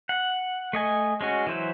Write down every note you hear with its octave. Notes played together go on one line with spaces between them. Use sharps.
F#5
A3 D#5 G#5
G#3 C#4 F#4
E3 F#3 E4 C5